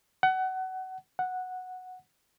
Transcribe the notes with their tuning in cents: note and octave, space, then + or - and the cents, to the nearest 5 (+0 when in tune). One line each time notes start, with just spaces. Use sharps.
F#5 +25
F#5 -5